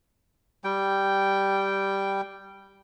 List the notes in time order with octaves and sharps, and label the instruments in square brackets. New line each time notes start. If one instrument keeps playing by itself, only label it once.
[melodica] G3 G5